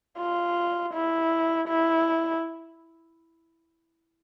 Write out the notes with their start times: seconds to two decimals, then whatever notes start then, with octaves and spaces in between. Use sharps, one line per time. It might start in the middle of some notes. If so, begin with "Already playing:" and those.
0.18 F4
0.93 E4
1.68 E4